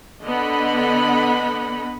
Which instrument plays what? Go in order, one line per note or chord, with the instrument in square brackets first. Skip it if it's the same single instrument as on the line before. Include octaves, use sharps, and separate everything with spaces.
[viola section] D3 B3 D#5 F#5 B5